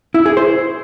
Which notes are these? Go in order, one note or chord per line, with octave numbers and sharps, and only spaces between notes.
E4
G#4
C5